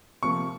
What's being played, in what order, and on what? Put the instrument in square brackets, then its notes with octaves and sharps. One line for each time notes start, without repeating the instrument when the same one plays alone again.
[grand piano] C3 F3 A#3 C#6